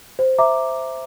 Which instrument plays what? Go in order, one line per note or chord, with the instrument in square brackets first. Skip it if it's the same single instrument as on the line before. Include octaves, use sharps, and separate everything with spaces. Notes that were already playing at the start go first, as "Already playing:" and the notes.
[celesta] C5
E5 A#5 D6